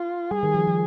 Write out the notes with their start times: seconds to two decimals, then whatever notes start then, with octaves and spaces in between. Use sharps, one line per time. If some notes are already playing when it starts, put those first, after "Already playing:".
Already playing: F4
0.31 G3 G#4
0.43 D#3
0.55 F3
0.67 F3